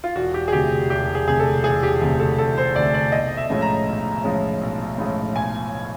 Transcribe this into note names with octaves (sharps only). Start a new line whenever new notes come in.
F4
E1 F#4
G4
G#4
D2 C3 G4
E1 G4
G#4
D2 C3 G#4
A4
E1 G#4
G4
D2 C3 G#4
A4
E1 A4
C5
D2 C3 D5
D5
B1 D#5
E5
A2 F3 G#3 C#4
A#5
B1
A2 F3 G#3 C#4
B1
A2 F3 G#3 C#4
B1 G#5